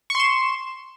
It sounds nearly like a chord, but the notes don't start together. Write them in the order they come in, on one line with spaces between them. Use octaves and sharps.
C#6 C6 E7